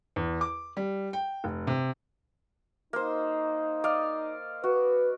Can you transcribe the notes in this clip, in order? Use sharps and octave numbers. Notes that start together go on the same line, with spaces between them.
E2
D6
G3
G5
F1
C3
A#3 D#4 C5
D5 D#5 F5
F#4 B4